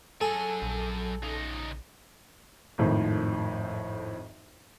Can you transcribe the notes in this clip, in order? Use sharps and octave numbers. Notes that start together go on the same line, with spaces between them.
F#3 G#4 A4 G#5
A#1
C#3 D#4
G#1 F2 A2 D#3 F3